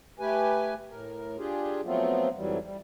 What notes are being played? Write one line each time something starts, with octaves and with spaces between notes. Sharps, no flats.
A3 G4 B4 G#5
A2 A#4
D4 F4 G4 G#4
F3 F#3 A3 B3 C4 F4
F2 G#2 E3 F#3 G3
G3